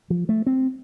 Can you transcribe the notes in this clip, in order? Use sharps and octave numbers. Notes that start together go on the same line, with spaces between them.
F3
A3
C4